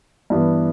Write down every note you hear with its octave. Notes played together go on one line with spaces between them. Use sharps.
G2 E3 B3